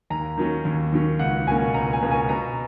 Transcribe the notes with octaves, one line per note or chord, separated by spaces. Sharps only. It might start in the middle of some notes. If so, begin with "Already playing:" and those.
D#2 A#5
D#3 F#3 C#4
D#2
D#3 F#3 C#4
C#2 F#5
B2 A#3 C#4 G#5
C#2 A#5
G#5
B2 A#3 C#4
G#5
B2 A#5